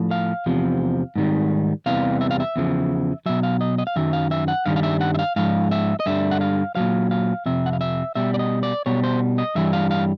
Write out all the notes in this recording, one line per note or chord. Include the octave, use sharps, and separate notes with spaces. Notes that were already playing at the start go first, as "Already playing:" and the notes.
Already playing: A2 F3
F5
E2 C3 F3
G#2 D#3 G3
E2 C3 E3 G3 F5
E5
F5
E5
E2 C#3 F3
B2 F#3 E5
F5
D#5
D#5
F5
F#2 D#3 F#3 E5
F5
E5
F#5
G2 D#3 G3 F5
F5
E5
F#5
E5
F5
G#2 F3 F5
E5
D#5
G2 D3 G3 E5
F#5
F5
A#2 F#3 F5
F5
F2 C3 E5
F#5
F5
E5
B2 G3 E5
D5
D#5
D5
B2 G3 C#5
C5
D#5
G2 E3 G3 E5
F5
F5